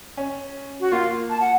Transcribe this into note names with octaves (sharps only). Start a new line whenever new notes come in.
C#4
F#4
A#3 F4
A5
F#5